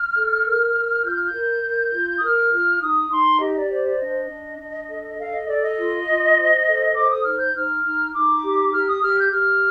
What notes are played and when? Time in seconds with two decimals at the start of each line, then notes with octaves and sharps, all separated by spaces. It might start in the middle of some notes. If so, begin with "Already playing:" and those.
Already playing: F6
0.16 A4
0.45 A#4
0.75 A#4
1.04 F4 G6
1.16 F6
1.26 G6
1.34 A#4
1.63 A#4
1.93 F4
2.17 D#6
2.23 A#4 F6
2.52 F4
2.81 D#4 D#6
3.11 D#4 C6
3.40 G4 D#5
3.56 D5
3.70 C5 D5
3.85 D5
4.00 D4 D#5
4.30 D4
4.58 D4
4.89 A4
5.18 A4 F5
5.32 D#5
5.47 A4 D5
5.62 D#5
5.77 F4
6.08 F4
6.37 C5
6.67 A4
6.95 C5 D6
7.11 D#6
7.25 D#4 F6
7.39 G6
7.55 D#4 F6
7.84 D#4
8.14 D#4 D6
8.44 G4
8.73 G4 F6
8.88 D#6
9.02 G4 F6
9.17 G6
9.32 G4 F6